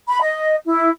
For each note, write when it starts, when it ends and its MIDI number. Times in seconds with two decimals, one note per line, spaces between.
0.08 0.19 83
0.22 0.57 75
0.66 0.88 64